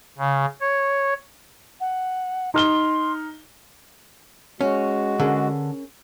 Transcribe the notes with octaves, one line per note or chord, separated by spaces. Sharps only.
C#3
C#5
F#5
D#4 C6 F6 G7
G#3 C#4 F#4
D3 C#4 G#4 A#4